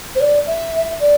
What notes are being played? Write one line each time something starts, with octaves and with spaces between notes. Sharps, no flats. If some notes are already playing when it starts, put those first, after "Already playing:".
C5
D5
E5
D5